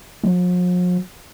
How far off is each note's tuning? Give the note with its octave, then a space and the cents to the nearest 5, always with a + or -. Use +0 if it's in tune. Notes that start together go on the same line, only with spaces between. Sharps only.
F3 +45